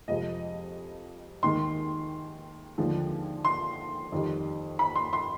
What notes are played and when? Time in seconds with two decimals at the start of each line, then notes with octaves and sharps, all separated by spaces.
0.08 F2 C3 F3 G#3 D#5
1.43 D#2 D#3 G#3 C6
2.78 D#2 D3 F3 G#3
3.45 C6
4.12 F2 D#3 G3
4.79 B5
4.96 C6
5.13 C6